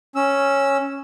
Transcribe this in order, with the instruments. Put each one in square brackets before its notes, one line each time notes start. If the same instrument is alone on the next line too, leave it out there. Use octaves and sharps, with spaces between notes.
[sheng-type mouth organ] C#4 E6